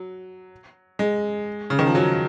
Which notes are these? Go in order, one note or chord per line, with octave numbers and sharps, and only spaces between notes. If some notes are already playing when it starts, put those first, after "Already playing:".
Already playing: F#3
G#3
C#3
D#3
F3
F#3